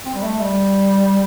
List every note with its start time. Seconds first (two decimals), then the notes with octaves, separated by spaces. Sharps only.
0.05 C4
0.14 G3
0.23 A3
0.41 G3